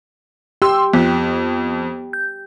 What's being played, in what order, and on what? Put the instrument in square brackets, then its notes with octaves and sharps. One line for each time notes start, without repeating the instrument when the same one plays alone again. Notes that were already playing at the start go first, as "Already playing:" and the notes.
[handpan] G4 [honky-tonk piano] C6 E6
[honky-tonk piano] F2 [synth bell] B3
[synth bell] G6